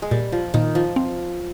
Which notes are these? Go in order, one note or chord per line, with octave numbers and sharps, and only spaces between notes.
G#3
A#2 G3
F3
A#2 D#3
F3
C4